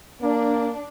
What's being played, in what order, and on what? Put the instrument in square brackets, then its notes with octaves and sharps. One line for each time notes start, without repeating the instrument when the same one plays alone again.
[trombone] A#3 [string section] D4